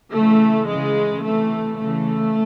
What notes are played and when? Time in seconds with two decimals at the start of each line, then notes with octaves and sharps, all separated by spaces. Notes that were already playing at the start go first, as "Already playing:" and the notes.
0.13 C#3 E3 A3
0.68 C#3 E3 G#3
1.24 C3 E3 A3
1.79 C#3 E3 A3